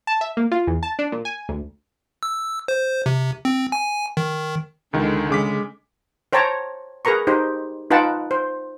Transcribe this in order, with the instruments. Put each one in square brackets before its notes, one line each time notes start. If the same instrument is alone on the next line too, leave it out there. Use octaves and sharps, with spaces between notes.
[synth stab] A5
E5
A#3
F4
E2
A5
D4
A#2
G#5
D2
[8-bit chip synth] E6
C5
C3
C4
G#5
D#3
[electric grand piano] C#2 D#3 [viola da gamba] D3 G#3
[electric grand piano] C#3 D6 B6 [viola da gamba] G#3
[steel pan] C5 C#5 G5 A5 A#5 C#6
G#4 A#4 B4 A#5 C#6
D#4 G4 C5
D#4 F4 B4 F#5 G5 A5
C5